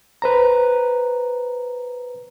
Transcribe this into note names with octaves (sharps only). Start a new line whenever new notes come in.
B4 C5 A#5